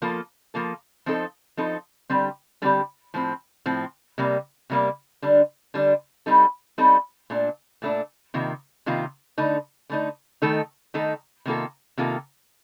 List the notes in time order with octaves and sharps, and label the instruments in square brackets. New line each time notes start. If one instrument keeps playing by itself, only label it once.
[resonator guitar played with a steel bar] F3 A#3 F4 A4
F3 A#3 F4 A4
F3 C4 D#4 A4
F3 C4 D#4 A4
D3 G3 C4 G4
D3 G3 C4 G4
A2 F3 C4
A2 F3 C4
C3 G3 A#3
C3 G3 A#3
D3 G3 D4
D3 G3 D4
G3 C4 D#4 A4
G3 C4 D#4 A4
A#2 A3 D4
A#2 A3 D4
C3 D#3 A#3 F4
C3 D#3 A#3 F4
D3 A3 D#4
D3 A3 D#4
D#3 A3 D#4 A4
D#3 A3 D#4 A4
C3 D#3 A#3 F4 A4
C3 D#3 A#3 F4 A4